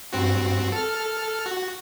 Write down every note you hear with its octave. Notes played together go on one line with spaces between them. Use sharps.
G2 C4 F#4
A4 F6
F#4